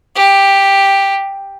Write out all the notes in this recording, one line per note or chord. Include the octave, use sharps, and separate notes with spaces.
G4